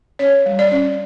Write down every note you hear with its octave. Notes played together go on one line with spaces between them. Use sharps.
C#4 C#5
G3
D5
C#4